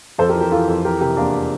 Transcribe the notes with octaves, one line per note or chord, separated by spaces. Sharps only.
F2 A4 C5
G4 A#4
E3
G4 A#4
E3 F4 A4
F2
E3 G4 A#4
C3 G4 A#4
E2 A#3 D4